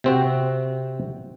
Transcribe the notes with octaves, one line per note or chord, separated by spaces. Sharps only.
C3 C4 F#4